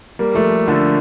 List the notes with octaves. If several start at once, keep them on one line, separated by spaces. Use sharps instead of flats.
G3 A#3
F3 A3
D3 F3